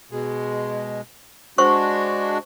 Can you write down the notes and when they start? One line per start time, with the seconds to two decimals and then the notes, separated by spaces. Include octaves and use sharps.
0.11 B2 G#3
1.58 G#3 D4 F#4 C5 C#6